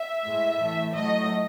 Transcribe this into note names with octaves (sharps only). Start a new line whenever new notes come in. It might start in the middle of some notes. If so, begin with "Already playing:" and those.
Already playing: E5
A2 G#3
A2 E3 A3
A2 F#3 A3 D#5